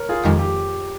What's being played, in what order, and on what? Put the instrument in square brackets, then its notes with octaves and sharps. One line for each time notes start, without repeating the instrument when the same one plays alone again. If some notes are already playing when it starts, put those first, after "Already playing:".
Already playing: [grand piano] A#4 C#5
F4 G#4
[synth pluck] F2 D#3 G#3 [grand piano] G4
[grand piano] G4